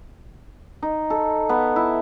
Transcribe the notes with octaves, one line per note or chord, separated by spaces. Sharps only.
D#4
A4
B3
E4